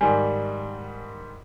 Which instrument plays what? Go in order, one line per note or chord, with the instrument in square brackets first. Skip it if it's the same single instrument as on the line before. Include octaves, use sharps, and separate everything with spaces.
[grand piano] G#2 D#3 G3 [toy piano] G#5